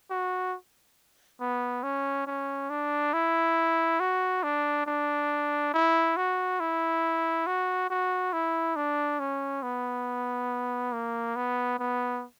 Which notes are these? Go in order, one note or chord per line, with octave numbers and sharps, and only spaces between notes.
F#4
B3
C#4
C#4
D4
E4
F#4
D4
D4
E4
F#4
E4
F#4
F#4
E4
D4
C#4
B3
A#3
B3
B3